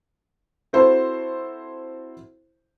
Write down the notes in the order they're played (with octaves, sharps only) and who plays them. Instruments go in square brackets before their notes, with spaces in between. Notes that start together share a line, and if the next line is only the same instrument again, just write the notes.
[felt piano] C4 E4 F#4 A4 C5